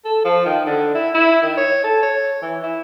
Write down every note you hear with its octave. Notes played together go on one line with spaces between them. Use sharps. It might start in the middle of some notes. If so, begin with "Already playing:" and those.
A4
F3
D#3
D3
E4
E4
D#3
C#5
A4
C#5
E3
E4